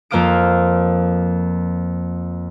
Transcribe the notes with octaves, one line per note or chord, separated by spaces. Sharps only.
F2 A#3 C5 F5 D#6 D7